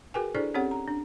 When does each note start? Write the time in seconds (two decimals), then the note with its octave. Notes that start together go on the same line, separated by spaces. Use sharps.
0.14 F#4 G#4 A#4 B4 G5 G#5
0.35 D4 E4 G#4 A4 C5 D5
0.54 C4 C#4 G4 A4 C#5 F#5
0.71 A#5
0.88 D4